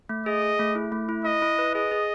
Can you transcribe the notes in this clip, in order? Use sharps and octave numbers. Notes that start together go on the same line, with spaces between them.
A3
G#4 D#5
G#4
A3
E4
A3
E4
E4 D#5
E4
B4
G#4 D#5
G#4